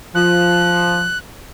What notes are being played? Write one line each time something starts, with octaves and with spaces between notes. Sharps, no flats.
F3 F#6